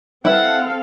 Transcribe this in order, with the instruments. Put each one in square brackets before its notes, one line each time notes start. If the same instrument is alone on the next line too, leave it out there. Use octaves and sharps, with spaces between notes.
[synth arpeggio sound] G3 B4 E6 [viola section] C4 A4 F5 [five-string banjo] E4 [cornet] F#5